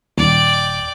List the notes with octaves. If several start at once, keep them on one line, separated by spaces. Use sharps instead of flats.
D#1 D5 G5